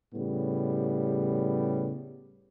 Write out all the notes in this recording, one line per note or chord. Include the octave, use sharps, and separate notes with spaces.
A2 C#3 G3 B3